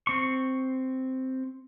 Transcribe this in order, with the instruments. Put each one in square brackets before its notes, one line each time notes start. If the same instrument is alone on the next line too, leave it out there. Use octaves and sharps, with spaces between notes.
[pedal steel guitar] C4 C#6